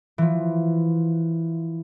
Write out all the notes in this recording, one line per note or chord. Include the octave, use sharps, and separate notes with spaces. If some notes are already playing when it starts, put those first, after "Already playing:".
E3 F3